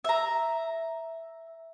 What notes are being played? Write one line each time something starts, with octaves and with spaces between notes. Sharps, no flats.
E5 A#5